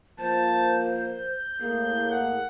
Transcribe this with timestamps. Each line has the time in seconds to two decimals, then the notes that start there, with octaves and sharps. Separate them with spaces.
0.20 F3 A#3 C5 A5
1.05 G6
1.60 A2 A#3 G#4
2.11 F#5